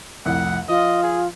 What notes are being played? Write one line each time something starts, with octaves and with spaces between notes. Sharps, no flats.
C2 F2 A2 F#5
F3 F4 D#5
G#4